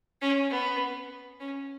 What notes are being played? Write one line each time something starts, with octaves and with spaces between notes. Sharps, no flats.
C#4
B3
C#4